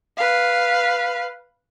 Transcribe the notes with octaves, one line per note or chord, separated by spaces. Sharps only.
B4 F5